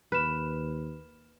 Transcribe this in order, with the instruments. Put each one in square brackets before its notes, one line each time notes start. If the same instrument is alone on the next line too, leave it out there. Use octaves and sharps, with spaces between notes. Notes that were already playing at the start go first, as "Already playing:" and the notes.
[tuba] D#2 [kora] B4 [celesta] F6 E7